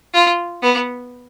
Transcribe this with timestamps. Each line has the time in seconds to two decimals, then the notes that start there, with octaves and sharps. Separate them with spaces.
0.14 F4
0.62 B3